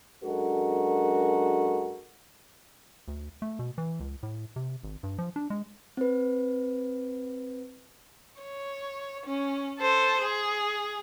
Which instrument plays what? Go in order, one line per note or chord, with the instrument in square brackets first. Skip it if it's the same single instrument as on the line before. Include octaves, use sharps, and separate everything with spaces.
[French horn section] F#2 G#3 D4 F#4 A4 A#4
[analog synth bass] D2
A3
B2
E3
C#2
A2
C3
G#1
G2
F3
D4
G#3
[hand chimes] C4 B4
[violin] C#5
C#4
A4 C5
G#4